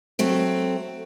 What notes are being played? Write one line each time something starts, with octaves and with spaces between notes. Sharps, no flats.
F#3 A3 C4